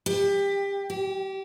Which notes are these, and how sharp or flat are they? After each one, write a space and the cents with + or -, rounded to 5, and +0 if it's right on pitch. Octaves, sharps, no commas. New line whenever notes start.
G4 +25
G4 -25